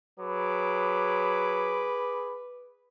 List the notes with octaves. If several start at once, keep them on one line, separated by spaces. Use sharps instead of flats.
F#3 G#4 B4 B5 D6